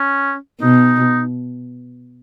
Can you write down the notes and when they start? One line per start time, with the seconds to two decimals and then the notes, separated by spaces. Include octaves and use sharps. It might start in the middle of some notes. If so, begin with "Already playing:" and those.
Already playing: C#4
0.61 B2 D#4